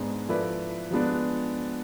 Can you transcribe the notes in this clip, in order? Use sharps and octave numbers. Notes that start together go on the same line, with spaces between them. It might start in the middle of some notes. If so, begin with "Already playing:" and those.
Already playing: G#2 G#3 B3 D4 G#4
F3 A3 E4 B4 D5
F3 G#3 B3 D4